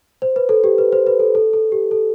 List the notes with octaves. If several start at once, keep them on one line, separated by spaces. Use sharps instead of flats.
C5
B4
A4
G4
B4
C5
B4
A4
A4
A4
G4
A4